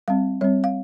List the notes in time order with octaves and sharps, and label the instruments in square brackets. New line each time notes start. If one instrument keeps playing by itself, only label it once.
[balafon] G3 C4 F5
G3 C4 C#5
F5